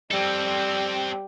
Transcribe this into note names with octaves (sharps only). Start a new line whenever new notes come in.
G3 C4 A4